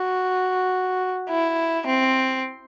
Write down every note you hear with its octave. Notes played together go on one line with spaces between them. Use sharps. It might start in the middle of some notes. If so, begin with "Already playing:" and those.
Already playing: F#4
E4
C4